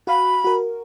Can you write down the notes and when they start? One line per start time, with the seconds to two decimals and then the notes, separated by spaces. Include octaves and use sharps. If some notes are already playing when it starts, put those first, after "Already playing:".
0.07 F#4 F5 B5
0.44 F#4 A#4